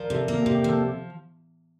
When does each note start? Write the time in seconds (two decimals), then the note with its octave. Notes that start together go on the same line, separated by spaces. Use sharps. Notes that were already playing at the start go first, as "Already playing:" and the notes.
Already playing: F3 A#4 D5
0.10 C3 A4
0.28 A#3
0.42 G4
0.46 C3
0.55 G4
0.64 F3 A4